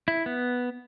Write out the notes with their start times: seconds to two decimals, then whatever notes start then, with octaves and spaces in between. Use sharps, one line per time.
0.08 E4
0.26 B3